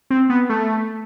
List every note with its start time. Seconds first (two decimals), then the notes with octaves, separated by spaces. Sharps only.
0.10 C4
0.30 B3
0.49 A3